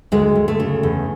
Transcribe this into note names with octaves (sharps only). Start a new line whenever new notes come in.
D2 G#3
D2
A3
C#3
E2